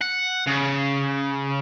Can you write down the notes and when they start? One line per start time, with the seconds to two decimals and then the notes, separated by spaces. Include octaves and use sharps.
0.01 F#5
0.47 C#3